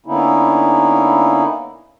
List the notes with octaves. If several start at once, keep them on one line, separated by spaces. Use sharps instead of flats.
D3 A#3 B3 C#4 D#4 E4